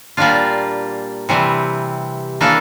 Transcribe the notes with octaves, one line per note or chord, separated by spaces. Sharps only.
A#2 G3 A#3 D4 F4
C3 E3 G3 C4
E3 A#3 D4 A4